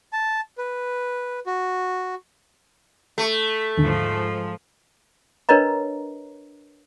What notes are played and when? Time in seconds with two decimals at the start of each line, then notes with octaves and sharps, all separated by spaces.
0.13 A5
0.58 B4
1.46 F#4
3.18 A3
3.78 D#2 G#2 D3 F3
5.49 D4 A#4 B4 C#5 D#5 A#5